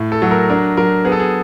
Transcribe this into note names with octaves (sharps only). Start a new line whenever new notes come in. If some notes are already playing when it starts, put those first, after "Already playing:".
Already playing: A2
A4
F#3
A#4
D4 A#4
F#3 A#4
B3 G#4
A4
G#4